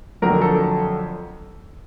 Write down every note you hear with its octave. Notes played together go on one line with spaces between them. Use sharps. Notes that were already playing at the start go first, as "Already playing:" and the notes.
F2 D3 F#3 A3 A#4
A4